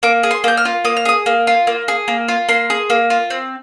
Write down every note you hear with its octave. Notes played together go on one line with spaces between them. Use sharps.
A#3 D6
G#4
C6
A#3 G6
F6
F4
A#3 D#6
F6
G#4 D#6
A#3
F4
A#3
G#4
A#3
F4
A#3 C6
G#4
A#3
F4
C4